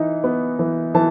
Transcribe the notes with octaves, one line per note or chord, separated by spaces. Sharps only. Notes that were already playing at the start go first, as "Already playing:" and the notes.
Already playing: E3 D#4
B3
E3
E3 A5